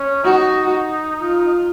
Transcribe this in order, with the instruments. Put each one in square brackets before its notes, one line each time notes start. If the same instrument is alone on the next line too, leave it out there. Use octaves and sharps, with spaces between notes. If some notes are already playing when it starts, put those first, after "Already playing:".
Already playing: [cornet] C#4
[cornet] D#4 [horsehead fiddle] F#4
[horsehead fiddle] F4